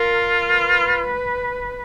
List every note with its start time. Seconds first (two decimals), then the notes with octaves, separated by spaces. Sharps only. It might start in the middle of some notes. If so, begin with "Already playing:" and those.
Already playing: F4 A#4
0.53 B4